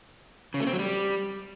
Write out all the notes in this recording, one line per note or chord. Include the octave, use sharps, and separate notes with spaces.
C#3
A3
C4
F#3
G3